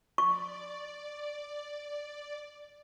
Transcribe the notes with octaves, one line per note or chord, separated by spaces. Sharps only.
D5 C#6